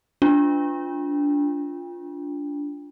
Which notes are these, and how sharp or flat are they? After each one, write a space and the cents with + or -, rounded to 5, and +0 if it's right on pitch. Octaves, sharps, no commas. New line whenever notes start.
D4 -20 F4 +0